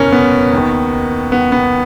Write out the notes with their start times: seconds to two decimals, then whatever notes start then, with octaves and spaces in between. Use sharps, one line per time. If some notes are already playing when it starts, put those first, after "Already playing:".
Already playing: F#1 E2 B2 C#4 A#4
0.12 B3
0.53 D#2 D#3
1.32 B3
1.52 B3